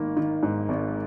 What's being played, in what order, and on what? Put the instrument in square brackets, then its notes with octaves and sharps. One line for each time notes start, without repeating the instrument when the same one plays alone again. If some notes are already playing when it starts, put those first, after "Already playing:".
Already playing: [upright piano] G#1 D#3 A#3
D#3
G#2
G#1